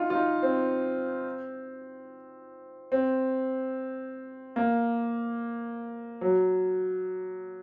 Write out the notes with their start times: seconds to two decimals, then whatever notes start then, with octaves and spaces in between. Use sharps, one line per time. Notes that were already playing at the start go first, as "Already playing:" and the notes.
Already playing: D#4 F4
0.10 F4
0.15 D#4
0.43 C4
2.92 C4
4.56 A#3
6.21 F#3